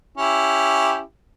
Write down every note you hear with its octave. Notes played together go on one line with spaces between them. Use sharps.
C#4 E4 G4